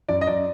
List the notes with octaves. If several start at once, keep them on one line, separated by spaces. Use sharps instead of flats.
F#2 D5
D#5
F#2 D5